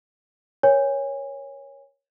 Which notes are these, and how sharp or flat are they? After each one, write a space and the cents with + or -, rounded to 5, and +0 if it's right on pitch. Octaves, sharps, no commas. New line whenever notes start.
A#4 +35 C#5 +0 G#5 -30